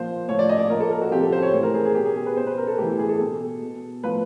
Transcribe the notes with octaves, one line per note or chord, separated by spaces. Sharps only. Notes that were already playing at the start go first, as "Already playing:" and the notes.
Already playing: A#2 F3 C5
A2 F3 C#5
D5
D#5
D5
A#2 F3 A#4
A4
A#4
F#4
C3 F3 G4
A4
C5
C#5
A2 E3 C5
A#4
G#4
G#4
B2 G4
G#4
G#4
B4
B2 C5
B4
A#4
A4
A2 E3 G4
G4
G#4
A4
B2
B2
A2 F3 B4